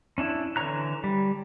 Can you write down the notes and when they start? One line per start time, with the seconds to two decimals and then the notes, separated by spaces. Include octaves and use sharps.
0.18 C#4 D4 E4
0.56 D3 E3 C#5 A#5 F#6
1.04 G3